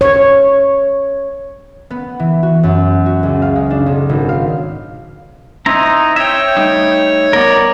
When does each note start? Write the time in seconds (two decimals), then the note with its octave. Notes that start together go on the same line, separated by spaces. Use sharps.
0.01 C#5
1.90 B3
2.19 E3
2.43 F#4
2.63 F#2
3.06 F#4
3.23 C#2
3.42 F5
3.56 G#3
3.70 D4
3.86 B1
4.09 G#1
4.29 F5
5.66 C4 D#4 E4 A#5
6.16 C#5 E5 G5
6.57 G3 A3 D#4
7.33 B3 A#4 D5 D#5